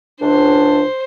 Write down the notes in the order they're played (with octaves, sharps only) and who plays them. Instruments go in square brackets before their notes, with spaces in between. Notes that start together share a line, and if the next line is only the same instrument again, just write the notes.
[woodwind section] C#2 D4 [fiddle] C5